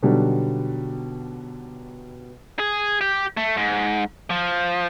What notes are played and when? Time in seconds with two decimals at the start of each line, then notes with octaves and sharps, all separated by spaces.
0.03 B2 D3 F#3 G3 D#4
2.59 G#4
3.01 G4
3.37 A3
3.57 G#2
4.30 F3